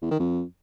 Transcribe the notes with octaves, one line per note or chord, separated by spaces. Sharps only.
E2
D#3
F2